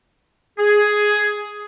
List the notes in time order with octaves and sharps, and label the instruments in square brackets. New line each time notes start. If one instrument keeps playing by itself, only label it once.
[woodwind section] G#4